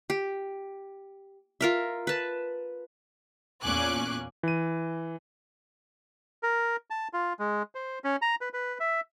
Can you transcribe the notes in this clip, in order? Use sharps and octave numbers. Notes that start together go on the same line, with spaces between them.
G4
F4 A#4 E5
B4 A5
E2 A#2 C#4 G#5 D6 F#6
E3 D#7
A#4
A5
F4
G#3
C5
C#4
A#5
B4
B4
E5